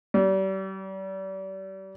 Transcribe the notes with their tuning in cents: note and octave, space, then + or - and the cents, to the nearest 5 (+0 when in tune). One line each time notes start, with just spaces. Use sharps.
G3 -35